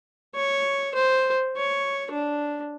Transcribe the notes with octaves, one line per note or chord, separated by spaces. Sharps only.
C#5
C5
C#5
D4